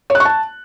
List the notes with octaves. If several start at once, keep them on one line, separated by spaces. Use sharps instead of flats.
C#5
F#6
C#6
A5